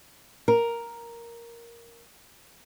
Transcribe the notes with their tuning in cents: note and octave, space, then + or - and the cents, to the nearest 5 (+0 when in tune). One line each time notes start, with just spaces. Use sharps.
A#4 +5